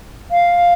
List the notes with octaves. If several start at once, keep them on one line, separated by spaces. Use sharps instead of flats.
F5